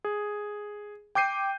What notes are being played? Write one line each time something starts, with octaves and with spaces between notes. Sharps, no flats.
G#4
G5 D6 G6 C7 D#7